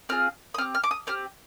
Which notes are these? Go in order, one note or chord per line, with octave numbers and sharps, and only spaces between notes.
C4 F4 G#4 F6
D#6
C4 G4 F6
F6
D6
D#6
C4 G4 F6